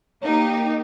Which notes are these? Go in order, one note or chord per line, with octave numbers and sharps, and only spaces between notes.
A#3 D#4 G4